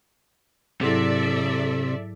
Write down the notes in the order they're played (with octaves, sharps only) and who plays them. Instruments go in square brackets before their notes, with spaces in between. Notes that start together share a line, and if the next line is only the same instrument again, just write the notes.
[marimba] G#2 F#3 E4 [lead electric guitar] C3 [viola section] A4 D5 E5